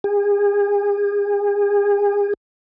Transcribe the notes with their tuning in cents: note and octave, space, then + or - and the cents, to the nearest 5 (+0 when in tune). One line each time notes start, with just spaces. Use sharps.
G#4 -35